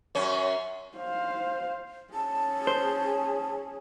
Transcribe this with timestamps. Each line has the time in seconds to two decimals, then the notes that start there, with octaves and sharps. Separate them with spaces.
0.15 F#2 C#4
0.98 C5 F5
2.14 C#4 G#4 A5
2.67 C5